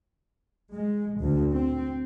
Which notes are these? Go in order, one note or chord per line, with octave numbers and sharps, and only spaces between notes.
G#3
D2
C4